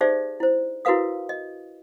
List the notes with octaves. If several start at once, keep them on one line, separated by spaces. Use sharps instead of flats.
D#4 G4 G#4 C5 D5 E5
E4 C5
E4 F#4 A#4 B4 F5 D#6
D#5